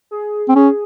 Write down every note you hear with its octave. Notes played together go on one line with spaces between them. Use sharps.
G#4
C4
C#4 G#4